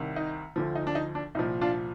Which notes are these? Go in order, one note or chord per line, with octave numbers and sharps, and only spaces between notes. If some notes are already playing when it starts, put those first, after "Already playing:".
Already playing: C2 C3 D#3
D#4
D2 D3 F3
D#4
D4
D#4
D4
C2 A#2 F3 D#4
D4 F4